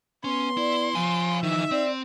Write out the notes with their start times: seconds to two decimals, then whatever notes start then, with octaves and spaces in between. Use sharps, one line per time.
0.24 B3 C#4 C6
0.57 E4 D5
0.95 F3 F5 G#5
1.43 D#3 E3 D#4 E5
1.71 C4 D5